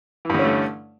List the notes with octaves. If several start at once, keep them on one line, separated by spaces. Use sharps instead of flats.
G2 D3 E3 A3 C#4